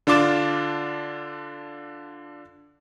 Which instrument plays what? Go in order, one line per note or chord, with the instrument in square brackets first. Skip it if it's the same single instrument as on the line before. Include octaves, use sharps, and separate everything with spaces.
[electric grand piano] D3 D4 F4 D6 A6 E7